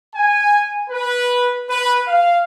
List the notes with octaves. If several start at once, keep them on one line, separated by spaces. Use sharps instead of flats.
G#5
B4
B4
F5